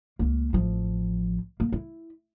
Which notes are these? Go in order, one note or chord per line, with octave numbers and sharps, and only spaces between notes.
C#2 A#3
A1 F3
A#3
E4